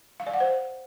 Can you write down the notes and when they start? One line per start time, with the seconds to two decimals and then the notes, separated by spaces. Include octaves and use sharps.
0.20 F5
0.27 D5
0.33 F#5
0.40 C5